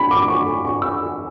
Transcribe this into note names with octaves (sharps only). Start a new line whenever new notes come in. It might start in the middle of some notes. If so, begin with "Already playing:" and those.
Already playing: B5
D6
C#6
C#6
E6